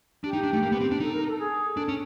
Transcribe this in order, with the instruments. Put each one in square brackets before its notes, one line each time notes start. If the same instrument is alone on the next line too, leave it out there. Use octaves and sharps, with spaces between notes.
[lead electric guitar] D4 [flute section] G4
[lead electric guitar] D#4
D4
A3
A#3
B3
C4
D4
[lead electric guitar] D#4 [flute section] A4
[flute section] A#4
A4
G#4
[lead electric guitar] D4 [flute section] A4
[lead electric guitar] C#4